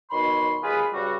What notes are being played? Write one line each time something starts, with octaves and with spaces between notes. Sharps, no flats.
B2 D#3 C#5 B5 C6
D#2 G#3 F4 G#4 B4 B5
G2 C#3 G3 F#4